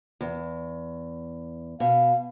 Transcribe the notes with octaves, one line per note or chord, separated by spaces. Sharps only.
E2
B2 F5